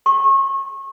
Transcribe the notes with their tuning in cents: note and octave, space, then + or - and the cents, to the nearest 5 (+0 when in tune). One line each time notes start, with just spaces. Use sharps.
C#6 -30